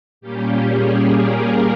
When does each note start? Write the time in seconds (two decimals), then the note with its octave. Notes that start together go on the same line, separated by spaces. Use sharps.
0.21 A#2 G3 A#3 C#4 G4
0.68 G#4
1.13 A#4